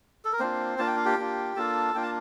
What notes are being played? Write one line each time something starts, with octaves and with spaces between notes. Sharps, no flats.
A4
A#4
A#3 C4 D4 F4 C5
A#3 D4 F4 A5
G5
F5
G4 G5
A#3 D4 F4
A#3 D4 F4 A4 A5
A#3 D4 F4 G5
A5